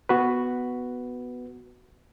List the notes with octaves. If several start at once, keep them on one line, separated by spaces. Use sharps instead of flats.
B3 F#4 B4